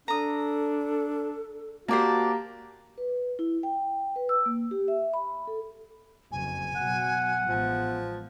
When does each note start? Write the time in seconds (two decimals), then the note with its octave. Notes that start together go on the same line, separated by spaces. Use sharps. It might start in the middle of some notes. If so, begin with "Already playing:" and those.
0.08 D4 A4 A#5 D#6
1.88 A#3 F#4 G4 C5 D5 A5
2.98 B4
3.39 E4
3.63 G5
4.16 B4
4.29 E6
4.46 A#3
4.71 G4
4.88 E5
5.14 B5
5.47 A4
6.32 F#1 F2 G#5
6.76 B2 F#3 F#5
7.47 A1 F3 G#3 B3